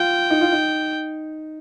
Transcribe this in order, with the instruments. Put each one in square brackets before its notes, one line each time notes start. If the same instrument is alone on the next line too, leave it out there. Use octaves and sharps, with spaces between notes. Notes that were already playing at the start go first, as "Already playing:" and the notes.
Already playing: [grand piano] F4 [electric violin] G5
[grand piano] D#4
F4
D#4